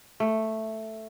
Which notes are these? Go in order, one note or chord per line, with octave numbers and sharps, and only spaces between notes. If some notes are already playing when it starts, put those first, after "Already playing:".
A3